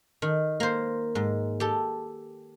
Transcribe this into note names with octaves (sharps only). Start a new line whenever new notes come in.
D#3
A#3 C5
G#2
G4 A4